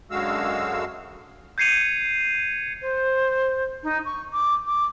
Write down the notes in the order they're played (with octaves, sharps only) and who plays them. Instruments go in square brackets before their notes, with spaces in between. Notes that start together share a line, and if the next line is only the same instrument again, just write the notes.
[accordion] F#2 D3 G#3 F#4 F5 E6
[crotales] G6 G#6 C7 C#7 D#7 F7
[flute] C5
D#4
C#6
D6
D6